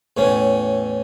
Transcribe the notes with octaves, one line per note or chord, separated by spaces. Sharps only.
E2 A2 C#4